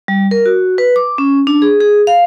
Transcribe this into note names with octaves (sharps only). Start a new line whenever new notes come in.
G3
A#4
F#4
B4
D6
C#4
D4
G#4
G#4
F5